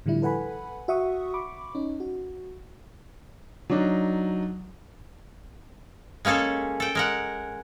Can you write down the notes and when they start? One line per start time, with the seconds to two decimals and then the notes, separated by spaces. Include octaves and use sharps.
0.06 A2 D3 F3 G3 E4
0.22 A4 B4 F#5 G#5 B5
0.88 F#4 E5 F#5 C#6 D#6
1.34 B5 C#6 D6
1.75 C#4 D#4
2.00 F#4
3.70 F#3 D4 D#4
6.25 G#3 A#3 C#4 G#4 A4
6.80 A4 G5
6.95 G#3 A#4 F#5